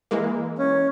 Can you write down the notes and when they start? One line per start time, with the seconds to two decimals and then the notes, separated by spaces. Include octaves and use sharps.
0.11 E3 G#3 A#3
0.58 C#4